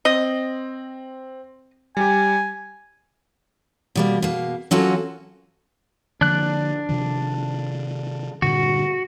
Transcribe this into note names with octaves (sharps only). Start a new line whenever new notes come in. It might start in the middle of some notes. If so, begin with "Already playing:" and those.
C4 D#5
G3 G4 G#5
B2 G3 A#3
B2 A#3
F#3 A#3 C#4 F4 F#4 A4
D3 F3 A#3 D4 F#6
C3 D#3 F3
G2 A#2 D3 F#4